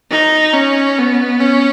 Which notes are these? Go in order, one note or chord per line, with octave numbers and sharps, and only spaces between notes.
D#4
C#4
B3
C#4